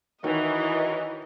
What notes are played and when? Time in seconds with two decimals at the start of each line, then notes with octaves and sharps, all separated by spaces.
0.24 D#3 E3 F#4 A#4 C#5 D#5